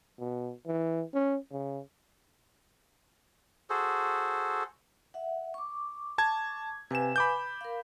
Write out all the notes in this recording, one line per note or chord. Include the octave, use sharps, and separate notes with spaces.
B2
E3
C#4
C#3
F#4 G#4 A4 C5
E5 F#5
C#6 D6
A5 G#6
C3 B4 F5 G#5 E7
B5 D6 G6
A#4 F5